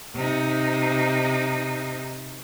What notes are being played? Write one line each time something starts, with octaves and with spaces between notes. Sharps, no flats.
C3 D#4